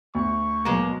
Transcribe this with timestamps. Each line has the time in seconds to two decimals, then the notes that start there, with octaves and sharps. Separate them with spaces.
0.15 D2 C#6
0.65 B2 F#3 G#3 A#3